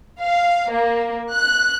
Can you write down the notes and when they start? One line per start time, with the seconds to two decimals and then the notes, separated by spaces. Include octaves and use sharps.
0.19 F5
0.70 A#3
1.32 F#6